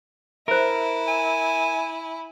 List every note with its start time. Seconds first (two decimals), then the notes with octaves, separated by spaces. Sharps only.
0.48 E4 A#4 C5 E5
1.07 G#5